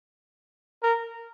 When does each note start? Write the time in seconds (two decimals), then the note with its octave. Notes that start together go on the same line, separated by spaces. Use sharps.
0.83 A#4